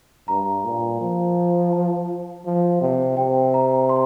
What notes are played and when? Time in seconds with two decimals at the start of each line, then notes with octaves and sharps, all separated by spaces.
0.28 G2 A#5
0.64 A#2
1.01 F3
1.73 A5
2.46 F3
2.81 C3
3.17 C3 G5
3.54 A#5
3.89 C6